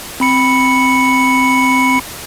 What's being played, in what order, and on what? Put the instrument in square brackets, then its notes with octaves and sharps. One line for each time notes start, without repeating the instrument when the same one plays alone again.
[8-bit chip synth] C4 B5 C#7